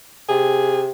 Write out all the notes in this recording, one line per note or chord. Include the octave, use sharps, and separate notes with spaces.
C3 G#4